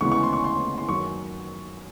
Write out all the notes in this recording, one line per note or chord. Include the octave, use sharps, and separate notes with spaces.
D2 C#3 E3 G#3 B3 C#6
C#6
C6
C#6
C6
C6
F#2 D#3 F#3 C#6